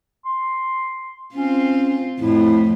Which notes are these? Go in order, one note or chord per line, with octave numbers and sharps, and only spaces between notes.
C6
C4 C#4 F4
F2 A2 E4